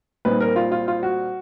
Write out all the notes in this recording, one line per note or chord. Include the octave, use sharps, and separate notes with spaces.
A#2 G3 C4 D#4 B4
A#4
F4
F4
F4
F#4